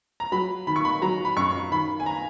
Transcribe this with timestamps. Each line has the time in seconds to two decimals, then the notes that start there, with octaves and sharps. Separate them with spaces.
0.20 A#5
0.32 F#3 B5
0.67 D#3 B5
0.76 C#6
0.85 B5
1.02 F#3 A#5
1.25 B5
1.37 F#2 C#6
1.71 D#3 B5
2.00 G#5
2.06 A#5